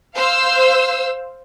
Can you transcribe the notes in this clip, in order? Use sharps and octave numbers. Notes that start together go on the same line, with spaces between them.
C5 F5 E6